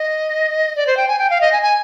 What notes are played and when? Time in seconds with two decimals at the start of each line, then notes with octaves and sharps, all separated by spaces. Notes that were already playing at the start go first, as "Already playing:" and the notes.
Already playing: D#5
0.76 D5
0.87 C5
0.97 G5
1.08 G#5
1.19 G5
1.30 F5
1.41 D#5
1.52 G#5
1.62 G#5